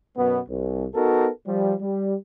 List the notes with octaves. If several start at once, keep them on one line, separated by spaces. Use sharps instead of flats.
F#2 B2 B3
C2
B3 D#4 F#4 A4 A#4
F3 G3
G3